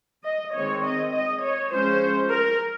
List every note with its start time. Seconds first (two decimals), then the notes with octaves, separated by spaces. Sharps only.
0.24 D#5
0.53 D#3 G#3 C4 C#5
0.83 D#5
1.12 D#5
1.41 C#5
1.71 F3 G#3 C#4 C5
2.29 A#4